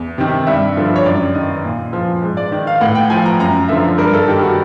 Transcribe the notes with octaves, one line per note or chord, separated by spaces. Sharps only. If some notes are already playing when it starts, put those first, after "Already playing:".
Already playing: E2
C3 D#3
G2 E5
D3 F3
C#5
F#2 D5
D#3 D#5
A#2
F3
G#2
D5
D#3
F5
A2 F#5
G5
F3 G#5
A#5
F#2 A#5
D3 F3 E5
G2 A#4
A4
D#3 G4
F#4